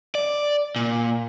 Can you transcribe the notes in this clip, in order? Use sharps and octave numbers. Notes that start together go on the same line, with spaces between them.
D5
A#2